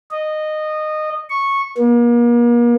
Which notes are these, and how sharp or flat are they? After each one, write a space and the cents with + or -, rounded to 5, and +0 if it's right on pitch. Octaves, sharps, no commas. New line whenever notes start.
D#5 -15
C#6 -10
A#3 +40